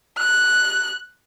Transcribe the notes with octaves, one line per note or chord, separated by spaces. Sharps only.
F#6